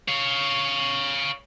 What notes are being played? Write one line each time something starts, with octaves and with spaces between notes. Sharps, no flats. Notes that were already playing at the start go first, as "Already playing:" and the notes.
C#5 F5